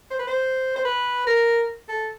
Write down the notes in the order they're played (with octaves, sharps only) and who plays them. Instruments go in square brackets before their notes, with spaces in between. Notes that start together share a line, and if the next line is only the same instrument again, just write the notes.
[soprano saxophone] C5
B4
C5
C5
B4
A#4
A4